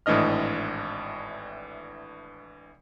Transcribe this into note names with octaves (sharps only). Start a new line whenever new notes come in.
G#1 A2 E3 D4 D#5 F6